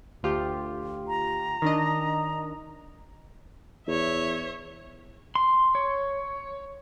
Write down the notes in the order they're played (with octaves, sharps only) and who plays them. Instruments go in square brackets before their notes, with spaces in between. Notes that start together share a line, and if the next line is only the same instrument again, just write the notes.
[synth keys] D2 F4 G4
[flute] A#5
[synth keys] D#3 D4 D#5
[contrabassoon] E2 [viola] C#5 E5
[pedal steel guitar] C6
C#5